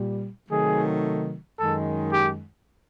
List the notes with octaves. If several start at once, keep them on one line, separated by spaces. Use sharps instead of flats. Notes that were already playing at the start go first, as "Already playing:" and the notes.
Already playing: A#2 G3
C3 D#3 F#3 A3 G#4
F#2 D#3 G#3 A4
G4